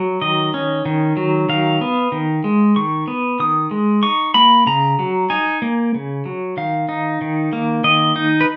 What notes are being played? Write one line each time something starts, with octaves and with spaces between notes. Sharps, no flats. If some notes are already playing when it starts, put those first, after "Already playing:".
Already playing: F#3
D#3 D#5
C#4
D#3
F#3
D#3 F5
B3
D#3
G#3
D#3 C#6
B3
D#3 D#6
G#3
D#4 C#6
A#3 B5
C#3 A#5
F#3
D#4 G#5
A#3
C#3
F#3
D#3 F5
D#4
D#3
A#3
D#3 D#5
D#4
B4